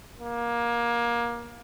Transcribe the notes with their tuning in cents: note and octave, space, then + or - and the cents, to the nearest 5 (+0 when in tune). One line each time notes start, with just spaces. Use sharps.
A#3 +20